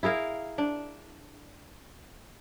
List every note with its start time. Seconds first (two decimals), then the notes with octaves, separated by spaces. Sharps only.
0.03 E4 G#4 A#4 F5
0.58 D4